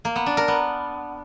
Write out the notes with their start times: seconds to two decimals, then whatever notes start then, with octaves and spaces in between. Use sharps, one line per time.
0.05 A#3
0.16 B3
0.26 D4
0.37 A#4
0.48 B3